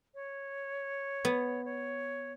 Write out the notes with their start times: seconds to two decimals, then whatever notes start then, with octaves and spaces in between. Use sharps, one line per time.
0.14 C#5
1.25 B3
1.65 C#5